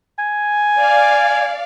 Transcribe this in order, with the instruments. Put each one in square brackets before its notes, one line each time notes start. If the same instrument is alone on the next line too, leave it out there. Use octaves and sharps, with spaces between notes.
[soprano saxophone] G#5
[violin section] D5 F5